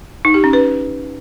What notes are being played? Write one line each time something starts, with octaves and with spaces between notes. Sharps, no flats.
D#4
G4
C#4
B4